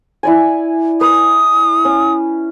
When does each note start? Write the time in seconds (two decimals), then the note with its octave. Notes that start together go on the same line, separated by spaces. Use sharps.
0.23 E4 D5 G#5
1.01 B4 D#6
1.85 C#4